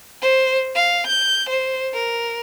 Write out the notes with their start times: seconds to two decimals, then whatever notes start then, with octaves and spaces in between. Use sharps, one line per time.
0.22 C5
0.75 F5
1.07 G6
1.49 C5
1.93 A#4